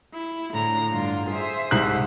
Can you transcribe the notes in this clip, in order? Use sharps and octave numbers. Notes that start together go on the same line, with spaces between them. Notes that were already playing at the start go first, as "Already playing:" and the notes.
E4
A2 D3 A#5
G2 D3 F4
G#4 C5 E5
C2 G#2 F#6